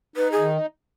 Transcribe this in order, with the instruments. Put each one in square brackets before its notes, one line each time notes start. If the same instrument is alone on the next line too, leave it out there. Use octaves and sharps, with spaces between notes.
[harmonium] D#4 [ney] B4
[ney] G#4
[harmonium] D#3